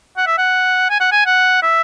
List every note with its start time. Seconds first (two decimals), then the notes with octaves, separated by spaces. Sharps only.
0.17 F#5
0.27 E5
0.38 F#5
0.90 G#5
1.00 F#5
1.12 G#5
1.26 F#5
1.62 E5